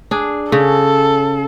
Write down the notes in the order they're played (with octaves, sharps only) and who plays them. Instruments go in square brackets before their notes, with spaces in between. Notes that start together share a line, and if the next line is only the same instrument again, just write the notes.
[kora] D4 G#4
[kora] C#3 C#4 [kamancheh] A4